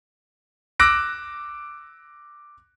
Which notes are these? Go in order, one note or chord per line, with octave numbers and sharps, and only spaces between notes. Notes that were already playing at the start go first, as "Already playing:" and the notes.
D6 E6 F#6 A#6 D7